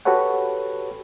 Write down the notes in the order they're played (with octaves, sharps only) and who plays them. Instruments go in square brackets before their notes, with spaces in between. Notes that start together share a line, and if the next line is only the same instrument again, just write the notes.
[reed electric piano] F#4 G4 A4 B4 C#5 F#5